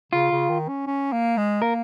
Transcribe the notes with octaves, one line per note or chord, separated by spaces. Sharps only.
C#3 F4
C#3
D#3
C#4
C#4
A#3
G#3
A#3 A#4